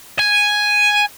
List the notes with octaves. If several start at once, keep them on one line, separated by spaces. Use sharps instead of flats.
G#5